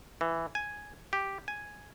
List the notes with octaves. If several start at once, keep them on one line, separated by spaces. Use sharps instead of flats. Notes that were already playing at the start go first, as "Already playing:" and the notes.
E3
G#5
G4
G#5